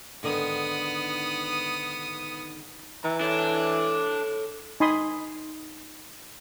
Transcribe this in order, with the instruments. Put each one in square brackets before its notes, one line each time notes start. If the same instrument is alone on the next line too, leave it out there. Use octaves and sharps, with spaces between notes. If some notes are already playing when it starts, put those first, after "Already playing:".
[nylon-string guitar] G#2 D3 D#3 [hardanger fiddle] B3 D#6
[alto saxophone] E3 [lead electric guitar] A#5
[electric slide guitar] D4 [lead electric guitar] A4 C#5
[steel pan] D#4 G#5 B5 C6 D#6